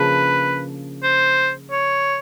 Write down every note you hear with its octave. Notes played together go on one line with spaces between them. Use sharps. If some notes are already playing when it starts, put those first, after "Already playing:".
Already playing: C#3 F3 A#3 D4 B4
C5
C#5